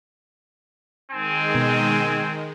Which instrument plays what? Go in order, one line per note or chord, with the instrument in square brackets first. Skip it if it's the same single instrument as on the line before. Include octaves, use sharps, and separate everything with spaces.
[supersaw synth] D#3 G#3 [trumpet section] C4 G#5
[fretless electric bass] B2